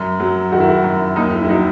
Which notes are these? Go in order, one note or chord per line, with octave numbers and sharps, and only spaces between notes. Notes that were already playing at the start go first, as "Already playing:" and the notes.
Already playing: F#2
F#3
D#3 F#4
E4
F#4
F#2
D#2 D#4
E4
E4
F#3 D#4